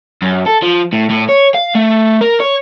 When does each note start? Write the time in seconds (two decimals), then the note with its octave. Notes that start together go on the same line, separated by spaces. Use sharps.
0.22 F#2
0.46 A4
0.62 F3
0.93 A2
1.10 A2
1.29 C#5
1.55 F5
1.75 A3
2.21 A#4
2.40 C#5